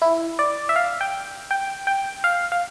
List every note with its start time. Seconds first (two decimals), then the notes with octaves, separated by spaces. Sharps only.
0.02 E4
0.39 D5
0.69 E5
0.76 F5
1.01 G5
1.51 G5
1.87 G5
2.24 F5
2.52 F5